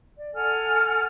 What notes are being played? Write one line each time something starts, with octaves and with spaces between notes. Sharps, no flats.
D5
A4 F#5 G#5 F6